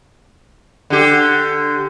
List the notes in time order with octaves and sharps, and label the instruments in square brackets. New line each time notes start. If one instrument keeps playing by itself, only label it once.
[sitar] D3 G4